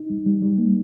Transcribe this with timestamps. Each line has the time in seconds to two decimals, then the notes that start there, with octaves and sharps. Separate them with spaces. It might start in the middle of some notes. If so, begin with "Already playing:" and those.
Already playing: D#4
0.10 G3
0.26 G3
0.42 G3
0.58 A#3